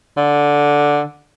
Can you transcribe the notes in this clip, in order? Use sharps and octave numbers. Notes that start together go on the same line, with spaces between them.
D3